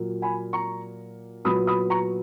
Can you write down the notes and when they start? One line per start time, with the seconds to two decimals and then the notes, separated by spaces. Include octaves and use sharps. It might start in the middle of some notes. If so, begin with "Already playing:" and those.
Already playing: A#2 F#3 A#3
0.22 G#5 B5
0.53 A#5 C#6
1.45 A#2 F#3 B3 B5 D#6
1.67 B5 D#6
1.90 A#5 C#6